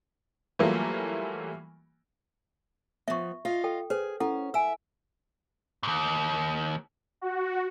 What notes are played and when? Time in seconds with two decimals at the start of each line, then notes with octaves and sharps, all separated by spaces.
0.59 E3 F#3 G3 A3 A#3 F4
3.08 F3 B3 E5 C#6
3.45 F4 D#5 F5
3.64 A4 G5
3.90 G#4 B4 C5
4.20 C#4 E4 A4 F#5
4.54 E5 G#5 E6
5.83 D#2 G#2
7.21 F#4